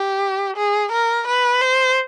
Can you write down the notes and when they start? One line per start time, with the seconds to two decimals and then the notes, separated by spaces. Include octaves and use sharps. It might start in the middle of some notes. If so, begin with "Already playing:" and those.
Already playing: G4
0.56 G#4
0.92 A#4
1.27 B4
1.61 C5